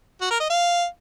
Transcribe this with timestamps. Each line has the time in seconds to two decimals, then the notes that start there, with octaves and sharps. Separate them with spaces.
0.21 F#4
0.31 A#4
0.40 D#5
0.50 F5